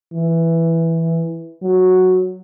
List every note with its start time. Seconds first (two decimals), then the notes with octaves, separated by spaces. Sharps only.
0.13 E3
1.62 F#3